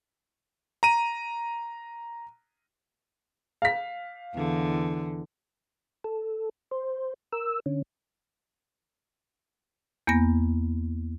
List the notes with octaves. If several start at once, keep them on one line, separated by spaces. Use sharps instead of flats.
A#5 D#7
F5 B6
E2 D3
A4
C5
A#4 E6
D3 C#4
E2 A#3 B3 A#6